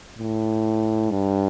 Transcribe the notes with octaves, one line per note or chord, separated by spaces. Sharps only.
A2
G2